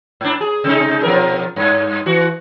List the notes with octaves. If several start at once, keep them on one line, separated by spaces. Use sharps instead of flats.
G#2 D4
G#4
C3 G#3 D#4
B2 F3 A#4
G2
E3 F#4